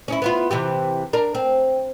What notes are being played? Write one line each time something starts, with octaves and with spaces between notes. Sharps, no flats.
C#4 D#4 E4
B3 E4 F4
C3 E3 G4
D4 A#4
C4